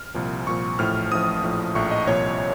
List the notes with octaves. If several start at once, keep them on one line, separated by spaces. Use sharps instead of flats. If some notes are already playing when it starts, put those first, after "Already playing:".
Already playing: F6
C2 A#2 F3
C2 A#2 F3 C#6
A1 A2 F3 F6
A1 A2 F3 D#6
A#1 A2 F3
A#1 A2 F3 C#6
D#5
C2 A#2 F3 C#5